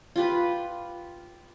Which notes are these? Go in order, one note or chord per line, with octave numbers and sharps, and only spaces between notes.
F4 G4 B4